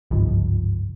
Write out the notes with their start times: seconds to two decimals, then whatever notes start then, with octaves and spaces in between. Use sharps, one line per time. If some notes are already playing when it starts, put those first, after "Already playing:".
0.11 G1 C#2 G#2 F3